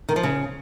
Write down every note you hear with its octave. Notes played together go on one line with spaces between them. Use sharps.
D#3
F3
C#3